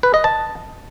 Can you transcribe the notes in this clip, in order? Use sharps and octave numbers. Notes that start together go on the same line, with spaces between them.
B4
D#5
A5